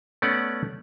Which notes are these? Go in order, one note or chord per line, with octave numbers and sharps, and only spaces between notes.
A3 B3 C#4 D5 F#5